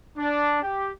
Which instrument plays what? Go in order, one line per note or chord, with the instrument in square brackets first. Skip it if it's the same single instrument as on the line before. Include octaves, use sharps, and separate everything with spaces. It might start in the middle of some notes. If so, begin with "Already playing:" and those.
[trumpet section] D4
G4